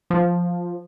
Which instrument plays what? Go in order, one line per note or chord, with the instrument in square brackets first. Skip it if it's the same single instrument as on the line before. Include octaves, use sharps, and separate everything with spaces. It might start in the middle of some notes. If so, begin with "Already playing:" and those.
[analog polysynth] F3